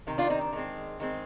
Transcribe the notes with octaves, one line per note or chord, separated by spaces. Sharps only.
C3 D#3
D4 F4
C4 D#4
D4
D#3 G#3 C4
D#3 G#3 C4